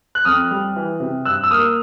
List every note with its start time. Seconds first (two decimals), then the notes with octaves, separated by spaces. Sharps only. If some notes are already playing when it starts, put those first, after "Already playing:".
0.15 F#6
0.25 F2 D#6 F6
0.51 G3
0.76 E3
1.00 C3
1.25 G2 E6 F#6
1.44 E6
1.51 A#3 D#6 F6